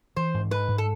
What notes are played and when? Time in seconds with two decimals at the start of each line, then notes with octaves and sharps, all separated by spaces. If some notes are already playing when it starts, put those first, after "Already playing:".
0.16 E3 C5
0.34 G#2
0.51 G#3 B4
0.68 G#2
0.78 A4